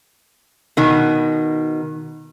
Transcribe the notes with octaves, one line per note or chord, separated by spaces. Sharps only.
B2 D#3